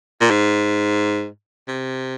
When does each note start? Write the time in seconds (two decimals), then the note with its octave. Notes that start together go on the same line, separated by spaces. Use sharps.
0.21 A#2
0.30 G#2
1.68 C3